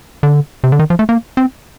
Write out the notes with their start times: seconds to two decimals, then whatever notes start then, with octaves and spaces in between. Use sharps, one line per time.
0.23 D3
0.64 C3
0.72 D3
0.79 D#3
0.90 F3
0.99 A3
1.09 A#3
1.37 C4